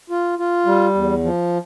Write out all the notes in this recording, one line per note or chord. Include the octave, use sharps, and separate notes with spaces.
F4
F4
G3
E2
F3